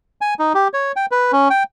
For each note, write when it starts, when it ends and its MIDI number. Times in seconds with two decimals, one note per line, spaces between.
0.21 0.34 80
0.39 0.53 63
0.54 0.68 67
0.74 0.92 73
0.96 1.06 79
1.11 1.32 71
1.32 1.48 61
1.50 1.63 79